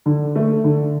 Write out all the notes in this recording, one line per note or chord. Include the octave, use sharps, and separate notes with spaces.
D3
A3
D3